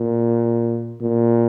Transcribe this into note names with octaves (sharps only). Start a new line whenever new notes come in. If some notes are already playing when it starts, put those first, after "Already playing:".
Already playing: A#2
A#2